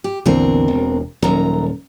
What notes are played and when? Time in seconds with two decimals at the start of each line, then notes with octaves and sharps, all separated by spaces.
0.04 G4
0.26 A#1 E2 B2 D3 C4 A#4
0.68 E1
1.22 D#1 F#2 A#5